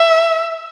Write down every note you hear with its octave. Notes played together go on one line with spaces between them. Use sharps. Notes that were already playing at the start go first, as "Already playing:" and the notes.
Already playing: E5